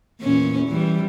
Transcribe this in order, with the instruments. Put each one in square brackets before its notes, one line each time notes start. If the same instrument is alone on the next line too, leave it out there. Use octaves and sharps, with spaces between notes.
[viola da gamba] E2 A#2 C#4
E3 G3